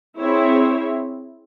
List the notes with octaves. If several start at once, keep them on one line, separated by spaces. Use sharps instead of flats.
C4 E4 G#4 C#5 E5